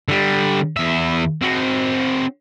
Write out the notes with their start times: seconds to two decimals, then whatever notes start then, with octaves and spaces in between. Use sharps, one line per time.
0.08 D3 G3
0.77 E2 E5
1.42 C4 F#4